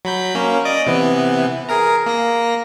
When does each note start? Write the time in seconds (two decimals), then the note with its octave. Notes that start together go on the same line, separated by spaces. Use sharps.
0.05 F#3 B5 G6
0.35 A#3 C#4
0.65 D5 D#5 D6
0.87 C3 E3 B3
1.69 G#4 A#4 A#5
2.06 A#3 A#6